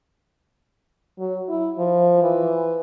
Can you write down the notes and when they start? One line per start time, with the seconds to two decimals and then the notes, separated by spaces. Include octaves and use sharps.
1.18 F#3
1.49 E4
1.78 F3
2.23 E3